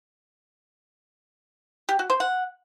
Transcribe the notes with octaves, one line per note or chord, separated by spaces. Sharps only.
G4
F#4
C5
F#5